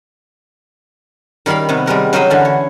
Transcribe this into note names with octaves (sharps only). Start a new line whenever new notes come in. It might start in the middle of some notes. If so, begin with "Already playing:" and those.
D#3 G3 A#4 F5 B5
C3 D#3 B3
G3 G#3 A#4 F#5
F#3 D#4 A#4 C5 D#5 B5
D3 E3 C#4
C#5